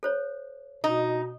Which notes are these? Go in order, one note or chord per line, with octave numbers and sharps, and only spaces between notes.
A4 C5 C#5
B2 D#4